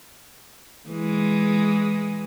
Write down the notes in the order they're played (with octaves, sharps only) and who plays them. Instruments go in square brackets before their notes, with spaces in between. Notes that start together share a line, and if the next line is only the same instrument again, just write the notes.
[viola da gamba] E3 G#3